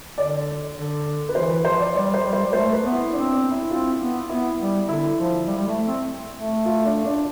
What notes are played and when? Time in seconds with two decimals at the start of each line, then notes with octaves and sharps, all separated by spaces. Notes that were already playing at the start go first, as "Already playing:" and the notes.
0.18 D3 D5
0.76 D3
1.29 B4
1.35 E3 C5
1.50 B4
1.64 F3 C5
1.80 D5
1.94 G3 D5
2.14 C5
2.23 G3
2.33 C5
2.46 G3
2.53 A3 C5
2.72 B4
2.83 B3
2.92 E4
3.11 C4 D4
3.31 D4
3.51 E4
3.71 C4 F4
4.00 B3
4.29 B3 E4
4.59 G3
4.88 D3 E4
5.18 F3
5.47 G3
5.57 G3
5.67 A3
5.86 C4
6.35 A3
6.65 F4
6.84 D4
7.04 D4